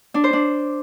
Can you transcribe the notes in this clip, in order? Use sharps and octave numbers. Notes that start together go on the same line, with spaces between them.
D4
C5
D4